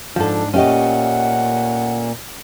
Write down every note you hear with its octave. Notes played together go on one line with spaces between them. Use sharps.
G#2 F3 D4 A4 F#5
A#2 A3 C#4 G4 D#5 F#5